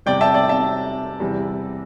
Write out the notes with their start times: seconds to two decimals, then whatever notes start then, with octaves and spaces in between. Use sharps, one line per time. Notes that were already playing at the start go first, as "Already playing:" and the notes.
0.06 E2 C3 G3 D5 G5
0.21 E5 A5
0.34 D5 G5
0.49 E5 A5
1.20 E2 C3 E3 G3